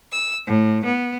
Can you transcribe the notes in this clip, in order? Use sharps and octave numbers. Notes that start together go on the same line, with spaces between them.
E6
A2
B3